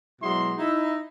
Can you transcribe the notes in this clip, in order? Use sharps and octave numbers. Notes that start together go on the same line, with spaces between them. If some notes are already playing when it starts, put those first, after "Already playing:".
B2 F#3 G#3 E4 C6
D#4 E4